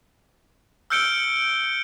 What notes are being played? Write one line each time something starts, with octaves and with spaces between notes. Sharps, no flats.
E6 F6 G6 C#7 D7 G7